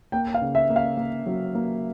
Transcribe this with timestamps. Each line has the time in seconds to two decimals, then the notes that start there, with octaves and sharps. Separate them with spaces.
0.12 A#3 G5
0.34 F5
0.41 C#3
0.55 E5
0.70 A#3
0.76 F5
0.97 A#3
1.26 F#3
1.55 A#3